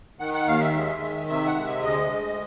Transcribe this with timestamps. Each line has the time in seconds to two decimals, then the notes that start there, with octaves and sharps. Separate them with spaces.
0.19 D#3 F#5
0.34 F#5
0.46 D#2 F5
0.60 E5
0.74 G#3
1.01 D#3
1.28 C3 E5
1.46 F#5
1.56 G#3
1.64 E5
1.82 D2 D#5
2.11 G#3